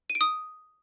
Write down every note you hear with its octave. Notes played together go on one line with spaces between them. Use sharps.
D#7
D7
D#6